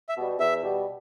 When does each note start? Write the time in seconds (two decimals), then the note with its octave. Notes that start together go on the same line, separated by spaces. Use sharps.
0.09 E5
0.17 B2 G3
0.39 E2 E5
0.62 B2 G3